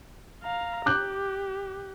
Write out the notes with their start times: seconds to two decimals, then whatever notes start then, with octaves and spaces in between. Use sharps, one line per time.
0.43 F5 A#5
0.86 G4 D6 F#6 G6